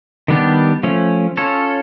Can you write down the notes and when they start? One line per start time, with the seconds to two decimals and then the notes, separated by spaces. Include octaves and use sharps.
0.28 D#3 G3 B3 D4 G4
0.83 F3 A3 C#4
1.37 C#4 F4 A4 C#5